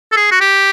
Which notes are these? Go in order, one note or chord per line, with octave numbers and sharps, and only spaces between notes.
A4
G#4
F#4
G4